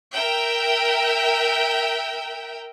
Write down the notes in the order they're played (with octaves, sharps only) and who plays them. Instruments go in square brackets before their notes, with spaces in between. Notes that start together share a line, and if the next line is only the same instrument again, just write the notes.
[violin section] A#4 E5 G5